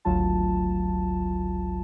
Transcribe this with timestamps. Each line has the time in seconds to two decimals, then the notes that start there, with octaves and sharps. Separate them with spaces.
0.05 G#1 D2 F#3 F4 A5